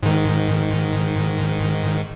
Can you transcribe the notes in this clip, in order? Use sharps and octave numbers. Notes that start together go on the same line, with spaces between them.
G#2 D#3